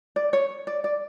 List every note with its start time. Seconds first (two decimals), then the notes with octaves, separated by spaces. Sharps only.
0.16 D5
0.33 C#5
0.67 D5
0.84 D5